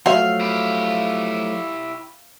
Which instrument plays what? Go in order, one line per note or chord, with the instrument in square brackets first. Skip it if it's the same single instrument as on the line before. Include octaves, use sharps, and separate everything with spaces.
[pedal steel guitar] F3 F#3 A3 [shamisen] F#4 E5 [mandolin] F5
[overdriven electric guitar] E4 G4